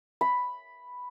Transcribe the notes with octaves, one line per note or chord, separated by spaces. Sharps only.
B5